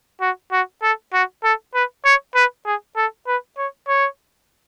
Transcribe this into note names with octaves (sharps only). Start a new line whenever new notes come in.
F#4
F#4
A4
F#4
A4
B4
C#5
B4
G#4
A4
B4
C#5
C#5